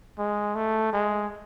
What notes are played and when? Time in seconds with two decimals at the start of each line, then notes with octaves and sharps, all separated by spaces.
0.18 G#3
0.56 A3
0.93 G#3